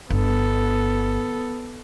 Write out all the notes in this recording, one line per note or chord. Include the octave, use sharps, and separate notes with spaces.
G1 B3 A4